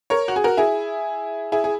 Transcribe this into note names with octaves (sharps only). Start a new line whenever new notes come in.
A#4 C#5
F#4
G#4
F#4 A#4
E4 G#4
E4 G#4
G#4